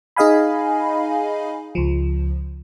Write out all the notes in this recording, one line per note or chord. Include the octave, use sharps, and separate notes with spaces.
D#4 G#4 D#5 F5 G#5 B5
C#2 F3